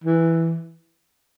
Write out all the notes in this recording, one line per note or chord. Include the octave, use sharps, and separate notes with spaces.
E3